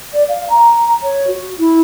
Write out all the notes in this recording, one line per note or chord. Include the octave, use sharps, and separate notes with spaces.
D5
F5
A#5
C#5
F#4
E4